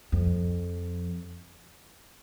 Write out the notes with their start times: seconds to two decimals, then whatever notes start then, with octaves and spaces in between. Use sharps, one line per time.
0.12 F2